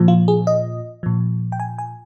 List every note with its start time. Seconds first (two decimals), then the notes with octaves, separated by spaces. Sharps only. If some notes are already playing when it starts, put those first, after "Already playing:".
Already playing: A#2 F3
0.08 F4
0.28 G#4
0.47 D#5
1.03 A#2 F3
1.52 G5
1.60 G#5
1.78 G#5